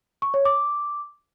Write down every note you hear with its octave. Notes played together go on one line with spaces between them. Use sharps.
C#6
C#5
D6